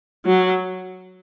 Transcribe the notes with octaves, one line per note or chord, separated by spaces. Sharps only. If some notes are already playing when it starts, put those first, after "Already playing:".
F#3